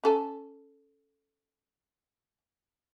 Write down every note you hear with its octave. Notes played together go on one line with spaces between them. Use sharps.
C#4 A4 G#5